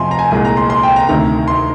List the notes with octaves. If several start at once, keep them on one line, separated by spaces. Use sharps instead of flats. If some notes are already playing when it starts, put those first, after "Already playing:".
Already playing: F2 C3 F3 G#5 C6
A#5
G#5
C2 A#2 G#3 G#5
A#5
C6
C6
G5
A#5
D2 C3 D#3 A#5
C6